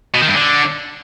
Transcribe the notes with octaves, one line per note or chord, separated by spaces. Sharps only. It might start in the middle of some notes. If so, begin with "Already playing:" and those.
B2
D#3
G2
D3